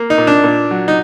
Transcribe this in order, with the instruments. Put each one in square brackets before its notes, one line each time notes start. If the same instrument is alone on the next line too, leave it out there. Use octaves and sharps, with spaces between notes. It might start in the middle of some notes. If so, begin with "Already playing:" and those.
Already playing: [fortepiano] A#3
D#4
A#2
D4
A#2
F#3
D#4